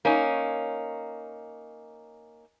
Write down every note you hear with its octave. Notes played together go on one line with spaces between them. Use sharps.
A#3 C#4 D#4